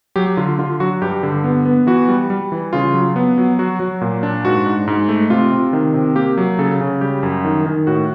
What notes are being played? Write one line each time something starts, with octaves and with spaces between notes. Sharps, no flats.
F#3 G4
D3 F4
D3 F4
F#3 F#4
G2 G4
D3
B3
B3
E3 F#4
G3
G3
E3
C#3 F4
F#3
B3
F#3
F#3 F#4
F#3
A#2
D4
G#2 F#4
G#2
G#2
A3
C3 F4
C3
D#3
C3
A#3 G4
F#3
C#3 A4
C#3
G3 G4
F#2
D#3
D#3
A2 F#4